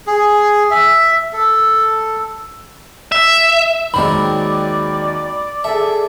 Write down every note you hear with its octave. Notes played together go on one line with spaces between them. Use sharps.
G#4
E5
A4
E5
D#2 F#3 G#3 C4 A#4 D5 B5
G#4 A4 E5